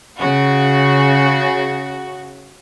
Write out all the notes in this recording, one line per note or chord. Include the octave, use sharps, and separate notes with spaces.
C#3 F#4